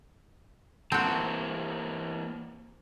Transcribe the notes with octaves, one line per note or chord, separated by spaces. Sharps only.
E3 A#3 C4 F#4 A5